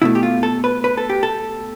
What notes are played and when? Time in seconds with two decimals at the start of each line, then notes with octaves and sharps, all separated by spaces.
0.02 B2 A3 E4
0.15 G4
0.23 F4
0.43 A4
0.64 B4
0.84 B4
0.97 A4
1.10 G4
1.23 A4